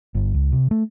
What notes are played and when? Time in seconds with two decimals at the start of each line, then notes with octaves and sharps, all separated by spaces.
0.15 G1
0.34 C#2
0.52 C3
0.71 A3